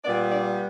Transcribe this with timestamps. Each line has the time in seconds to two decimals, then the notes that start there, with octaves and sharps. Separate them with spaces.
0.04 A#2 G3 B3 D5
0.30 D5